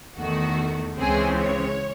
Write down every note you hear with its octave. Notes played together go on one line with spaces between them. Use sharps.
E2 D#3 A3 F#4
C#2 C#3 E3 G#3 C4 G#4
C#5